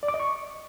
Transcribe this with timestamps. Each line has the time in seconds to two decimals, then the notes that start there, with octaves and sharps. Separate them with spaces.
0.03 D5
0.08 D6
0.14 D#5
0.20 C#6